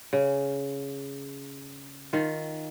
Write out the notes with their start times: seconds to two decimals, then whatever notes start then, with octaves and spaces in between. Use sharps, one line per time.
0.13 C#3
2.13 D#3 F4